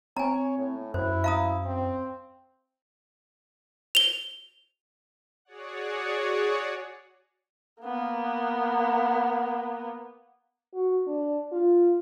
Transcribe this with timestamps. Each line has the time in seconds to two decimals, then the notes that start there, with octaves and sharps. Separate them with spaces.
0.17 C4 C#5 G#5 A#5
0.58 A2
0.94 F#2 E4 C5
1.24 F5 A#5 D#6
1.65 C4
3.95 F7 G7
5.45 F#4 G#4 C#5 D5 F#5
7.82 A#3 B3
10.74 F#4
11.07 D4
11.52 F4